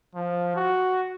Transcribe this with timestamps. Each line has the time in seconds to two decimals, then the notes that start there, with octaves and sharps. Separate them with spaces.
0.15 F3
0.56 F#4